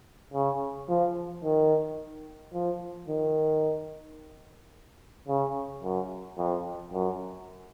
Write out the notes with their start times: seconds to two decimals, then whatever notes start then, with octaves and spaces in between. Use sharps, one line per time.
0.34 C#3
0.89 F3
1.44 D#3
2.53 F3
3.08 D#3
5.28 C#3
5.83 F#2
6.37 F2
6.92 F#2